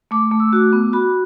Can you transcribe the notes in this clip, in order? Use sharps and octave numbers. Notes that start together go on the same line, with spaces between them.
A3 D6
A3
E6
F#4 D6
B3
F#4 B5